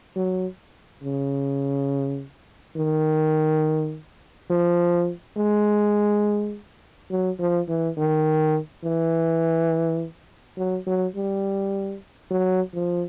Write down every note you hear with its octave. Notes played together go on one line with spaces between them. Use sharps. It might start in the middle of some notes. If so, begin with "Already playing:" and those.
F#3
C#3
D#3
F3
G#3
F#3
F3
E3
D#3
E3
F#3
F#3
G3
F#3
F3